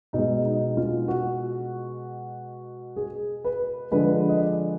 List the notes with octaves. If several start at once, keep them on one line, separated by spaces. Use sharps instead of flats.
B2 G#3 D#4
D#4
F4
F#4
G#4
B4
D3 F3 G#3 B4
D#5
D5